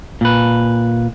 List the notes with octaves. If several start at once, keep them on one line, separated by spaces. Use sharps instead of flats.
A#2 B4